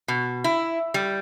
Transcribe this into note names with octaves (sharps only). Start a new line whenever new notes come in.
B2
E4
G3